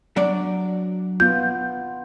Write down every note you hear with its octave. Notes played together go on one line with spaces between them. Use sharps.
F#3 D4 D5
B3 F4 G6